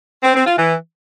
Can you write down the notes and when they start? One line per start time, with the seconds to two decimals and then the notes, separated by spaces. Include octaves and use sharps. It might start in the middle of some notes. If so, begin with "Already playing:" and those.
0.23 C4
0.34 C4
0.46 F4
0.57 E3